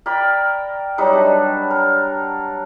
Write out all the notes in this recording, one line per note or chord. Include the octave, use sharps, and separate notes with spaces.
A#4 D5 G5 B5
F#3 G3 D#4 B4
D4
A#4